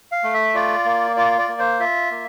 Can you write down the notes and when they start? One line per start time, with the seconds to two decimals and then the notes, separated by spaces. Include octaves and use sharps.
0.12 F5
0.23 A3
0.34 E5
0.54 F4 D5
0.85 A#3
1.16 F4 D5
1.38 D5
1.48 A#3
1.59 C5
1.80 F4 E5
2.11 A#3